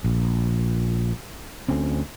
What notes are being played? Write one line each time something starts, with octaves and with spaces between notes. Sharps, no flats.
A#1
D2 C4 C#4